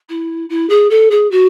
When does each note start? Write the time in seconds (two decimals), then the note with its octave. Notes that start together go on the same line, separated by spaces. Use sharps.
0.09 E4
0.49 E4
0.69 G#4
0.90 A4
1.11 G#4
1.31 F#4